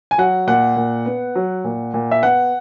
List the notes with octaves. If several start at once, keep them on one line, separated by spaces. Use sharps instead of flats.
G#5
F#3 F#5
A#2 F#5
A#2
B3
F#3
A#2
A#2
E5
B3 F#5